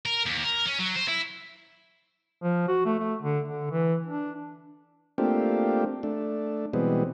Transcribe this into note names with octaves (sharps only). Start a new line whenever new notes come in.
A#4
D#2
A#4
C#4
F#3
C5
E4
F3
F#4
A3
A3
D3
D3
E3
D4
A3 A#3 C4 D4 F4 G4
A3 D4
B2 E3 G3 G#3 B3 C4